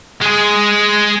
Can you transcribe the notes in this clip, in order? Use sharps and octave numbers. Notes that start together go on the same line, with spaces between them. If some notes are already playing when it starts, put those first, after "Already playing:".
G#3 G#4